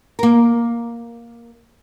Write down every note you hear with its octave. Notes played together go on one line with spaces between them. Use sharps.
A#3 A#4